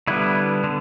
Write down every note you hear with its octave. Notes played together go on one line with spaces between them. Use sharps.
D3 G3 B3 E4
D3